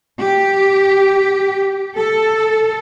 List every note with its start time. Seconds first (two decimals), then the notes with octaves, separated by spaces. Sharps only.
0.20 G4
1.96 A4